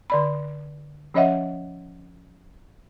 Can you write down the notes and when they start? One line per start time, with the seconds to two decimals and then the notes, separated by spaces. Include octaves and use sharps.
0.10 D3 D5 B5
1.14 F3 C#4 C#5 D#5 E5 F#5